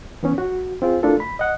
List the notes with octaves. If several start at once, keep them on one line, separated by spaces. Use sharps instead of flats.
E3 B3 C#4
F#4
C4 F4 G#4
A3 D4 E4 F4 A4 A#4
B5
D#5 F#5